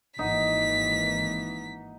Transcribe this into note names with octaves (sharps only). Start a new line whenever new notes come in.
G#1 E3 A#3 D#4 F#5 B6